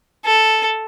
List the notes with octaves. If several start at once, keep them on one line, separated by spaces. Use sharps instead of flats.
A4